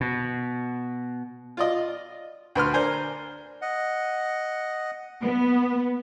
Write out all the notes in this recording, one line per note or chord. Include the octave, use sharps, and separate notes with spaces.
B2
F4 D5 D#5
D2 B4 C6 F6
D4 A#4 C5 G#5
D#5 F#5
B3